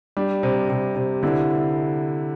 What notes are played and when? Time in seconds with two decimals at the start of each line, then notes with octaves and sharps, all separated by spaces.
0.17 G3 D4
0.43 C3
0.70 C3
0.96 C3
1.23 D3 E4